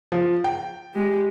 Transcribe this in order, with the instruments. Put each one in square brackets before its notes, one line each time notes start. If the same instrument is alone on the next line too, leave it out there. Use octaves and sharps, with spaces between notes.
[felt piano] F3
G5
[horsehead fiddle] G#3 G4